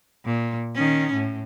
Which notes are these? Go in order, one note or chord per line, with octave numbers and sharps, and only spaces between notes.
A#2
D#3 C#4
A2